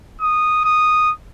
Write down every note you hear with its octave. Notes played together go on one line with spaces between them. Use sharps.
D#6
D#6